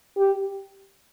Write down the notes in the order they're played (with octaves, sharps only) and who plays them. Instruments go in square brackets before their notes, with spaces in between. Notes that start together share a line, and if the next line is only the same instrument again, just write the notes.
[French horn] G4